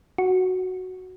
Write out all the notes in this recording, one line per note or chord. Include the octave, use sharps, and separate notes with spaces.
F#4